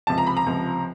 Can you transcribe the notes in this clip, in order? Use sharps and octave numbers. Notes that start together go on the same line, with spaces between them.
C#2 C3 F3 A5
A#5
B5
A#5
C#2 C3 F3